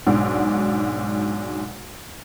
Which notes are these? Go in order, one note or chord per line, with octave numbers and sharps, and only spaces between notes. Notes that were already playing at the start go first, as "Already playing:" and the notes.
B1 G#2 D4 F#4